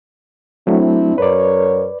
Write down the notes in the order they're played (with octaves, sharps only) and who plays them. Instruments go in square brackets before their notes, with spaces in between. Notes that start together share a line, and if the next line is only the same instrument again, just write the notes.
[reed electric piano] F#3 A3 [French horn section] C4 D4 E4
[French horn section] F#2 A#4 C#5 [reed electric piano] B4 D5